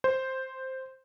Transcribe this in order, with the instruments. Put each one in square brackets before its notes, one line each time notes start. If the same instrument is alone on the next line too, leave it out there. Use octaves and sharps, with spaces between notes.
[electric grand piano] C5